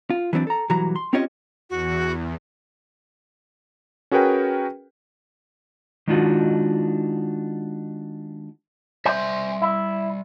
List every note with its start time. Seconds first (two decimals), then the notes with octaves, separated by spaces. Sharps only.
0.10 F4
0.33 E3 F#3 C4 D4
0.47 A4 A#5
0.70 B1 E3 F#3 G3 F#4 A#5
0.96 C6
1.13 C4 C#4 F4 G4 C#5 D#5
1.70 E2 F#4
4.11 C#4 F#4 G#4 A#4 B4 G5
6.07 D#3 G#3 D4 D#4 F4 F#4
9.05 G3 C5 E5 G#5
9.62 E4